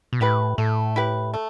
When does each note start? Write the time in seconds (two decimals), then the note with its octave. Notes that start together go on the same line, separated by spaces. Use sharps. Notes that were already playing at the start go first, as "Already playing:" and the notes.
0.13 B2
0.20 A2 E4 G4 B4
0.58 A2 A3
0.96 E4 G4 B4
1.34 A3